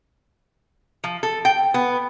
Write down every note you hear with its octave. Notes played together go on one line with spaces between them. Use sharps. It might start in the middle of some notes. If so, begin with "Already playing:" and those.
F3
A4
G5
B3